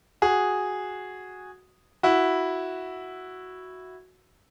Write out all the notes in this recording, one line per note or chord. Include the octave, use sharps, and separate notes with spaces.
F#4 G#4
E4 F#4